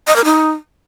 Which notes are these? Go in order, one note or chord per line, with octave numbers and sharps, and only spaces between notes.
D#5
A#4
D#4